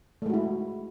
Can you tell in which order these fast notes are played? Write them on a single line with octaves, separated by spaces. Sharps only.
A3 G#3 F#4 E4